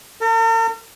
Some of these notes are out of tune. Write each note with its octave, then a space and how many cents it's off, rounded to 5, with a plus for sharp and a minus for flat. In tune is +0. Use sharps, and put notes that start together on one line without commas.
A#4 -45